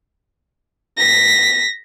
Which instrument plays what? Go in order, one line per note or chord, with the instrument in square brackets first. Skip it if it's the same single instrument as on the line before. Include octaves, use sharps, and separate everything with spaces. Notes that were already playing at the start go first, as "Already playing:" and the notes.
[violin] A#6 B6